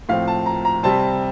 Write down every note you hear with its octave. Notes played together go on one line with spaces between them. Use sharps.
A2 F3 C4 F5
A5
A#5
A#5
C3 G3 C4 A5